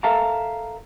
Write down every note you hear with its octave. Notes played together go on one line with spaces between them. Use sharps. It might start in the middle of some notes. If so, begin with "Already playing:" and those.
A4 A#4 E5 F5 A5 A#5